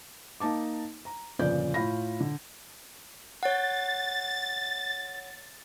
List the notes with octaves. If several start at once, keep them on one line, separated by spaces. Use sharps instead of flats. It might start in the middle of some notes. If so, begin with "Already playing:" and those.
A#3 D#4 A5 D6
A#5
G1 F2 A#2 C#3 D5 G6
A2 F4 B5 A#6
D3
C#5 F#5 A6